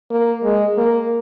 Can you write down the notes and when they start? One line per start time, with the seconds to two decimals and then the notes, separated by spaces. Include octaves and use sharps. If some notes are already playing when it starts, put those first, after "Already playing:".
0.11 A#3
0.44 G#3
0.77 A#3